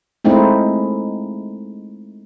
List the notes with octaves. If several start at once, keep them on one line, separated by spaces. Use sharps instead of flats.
G#3 A3 C4 D#4 E4